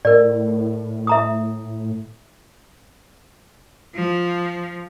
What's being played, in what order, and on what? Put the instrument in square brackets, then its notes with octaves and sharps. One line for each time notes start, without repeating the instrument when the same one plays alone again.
[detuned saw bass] A2 [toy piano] A#4 D5
[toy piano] E5 A#5 D#6
[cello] F3